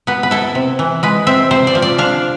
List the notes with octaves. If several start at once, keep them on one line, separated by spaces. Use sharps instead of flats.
B3 B4
B4
E4 A4
C3
E3
G#3 B4
C4 E5
C3 C5
D5
F3
D5
D4 F5